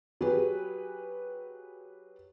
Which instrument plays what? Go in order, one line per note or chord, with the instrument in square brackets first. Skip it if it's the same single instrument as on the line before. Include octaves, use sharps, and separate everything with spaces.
[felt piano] F#3 G4 G#4 B4